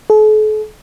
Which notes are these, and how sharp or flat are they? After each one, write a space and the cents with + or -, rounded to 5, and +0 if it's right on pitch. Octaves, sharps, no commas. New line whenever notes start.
A4 -45